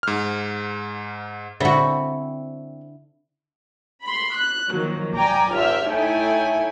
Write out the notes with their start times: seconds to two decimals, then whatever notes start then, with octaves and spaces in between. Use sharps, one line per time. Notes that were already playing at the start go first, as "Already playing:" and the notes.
0.03 G#2 F6
1.60 D3 C4 E4 F#4
4.03 B5 C6
4.35 F#6
4.71 D#3 F3 F#3 A#3
5.14 D5 G5 G#5 A#5 D6
5.53 G#1 F4 G4 E5 F6
5.87 A3 D#4 E4 C#5 G5 G#5